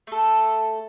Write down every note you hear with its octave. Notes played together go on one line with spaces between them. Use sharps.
A3 A4